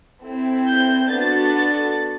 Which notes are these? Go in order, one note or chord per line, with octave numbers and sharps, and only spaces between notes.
C4 E4 A4
G6
B3 D4 F#4 A4 A6